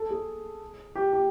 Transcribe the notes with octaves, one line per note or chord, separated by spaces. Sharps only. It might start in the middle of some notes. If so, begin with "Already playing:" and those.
Already playing: A4
G#4
G4
G4